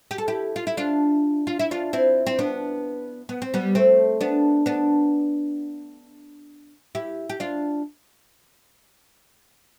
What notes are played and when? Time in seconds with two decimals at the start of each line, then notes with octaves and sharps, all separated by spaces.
0.11 G4
0.18 A4
0.28 E4 G4
0.56 F4
0.67 E4
0.77 D4 F4
1.47 F4
1.59 E4
1.71 D4 F4
1.93 C4 E4
2.26 C4
2.39 B3 D4
3.29 B3
3.42 C4
3.54 G3 B3
3.75 A3 C4
4.21 B3 D4
4.66 B3 D4
6.95 E4 G4
7.29 G4
7.40 D4 F4